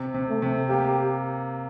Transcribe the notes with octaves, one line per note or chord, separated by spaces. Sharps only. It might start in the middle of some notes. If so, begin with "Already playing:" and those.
Already playing: C3
C3
A3
C3
A#3 G4